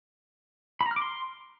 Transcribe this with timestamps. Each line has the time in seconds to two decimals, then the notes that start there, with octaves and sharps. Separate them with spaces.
0.81 B5
0.86 A#5
0.91 F6
0.96 D6
1.02 C6